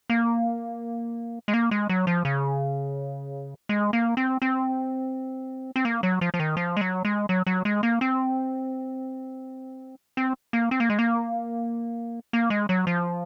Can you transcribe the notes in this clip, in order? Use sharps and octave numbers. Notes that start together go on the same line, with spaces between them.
A#3
G#3
A#3
G#3
F#3
F3
C#3
G#3
A#3
C4
C4
C4
A#3
F#3
F3
F3
D#3
F3
G#3
F#3
G#3
F#3
F#3
G#3
A#3
C4
C4
A#3
C4
A#3
G#3
A#3
A#3
G#3
F#3
F3